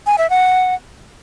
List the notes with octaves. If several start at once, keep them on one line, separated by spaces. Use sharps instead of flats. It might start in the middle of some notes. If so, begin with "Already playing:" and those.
G#5
E5
F#5